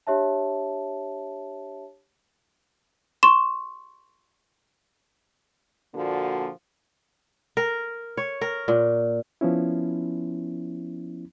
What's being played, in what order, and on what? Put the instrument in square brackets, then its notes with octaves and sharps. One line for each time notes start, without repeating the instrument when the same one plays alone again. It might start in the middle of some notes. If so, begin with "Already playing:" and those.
[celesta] D4 G4 C#5 E5 A5
[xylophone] C6 C#6 E7
[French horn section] A#2 D3 F3 A#3 F#4
[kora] A#4
C#5
A#4
A#2
[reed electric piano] F3 B3 C#4 E4